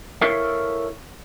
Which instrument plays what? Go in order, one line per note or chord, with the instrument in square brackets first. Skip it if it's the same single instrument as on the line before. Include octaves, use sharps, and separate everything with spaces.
[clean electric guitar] E4 A4 A#4 C#5 E5 F5